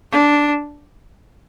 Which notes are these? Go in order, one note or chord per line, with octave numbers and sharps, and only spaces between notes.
D4